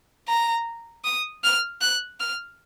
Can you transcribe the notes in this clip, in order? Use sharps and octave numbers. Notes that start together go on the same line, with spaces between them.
A#5
D#6
F6
F#6
F6